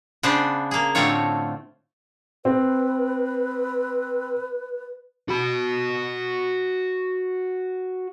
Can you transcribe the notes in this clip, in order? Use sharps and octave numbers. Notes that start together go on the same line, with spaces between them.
C#3 B3 D4 C5
A#3 G#4
A2 D3 A3 C4 F4 C#5
C4 B4
F#4 B5